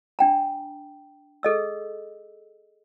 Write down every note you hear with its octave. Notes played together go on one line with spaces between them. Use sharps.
D4 G5 A#5
G#4 A4 D#5 E6